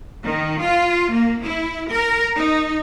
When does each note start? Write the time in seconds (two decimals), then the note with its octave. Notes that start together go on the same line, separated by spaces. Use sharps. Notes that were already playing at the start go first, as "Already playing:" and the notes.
0.24 D#3
0.61 F4
1.11 A#3
1.42 E4
1.90 A#4
2.35 D#4